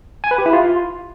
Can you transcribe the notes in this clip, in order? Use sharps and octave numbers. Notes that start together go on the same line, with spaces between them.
G#5
B4
G4
E4
F4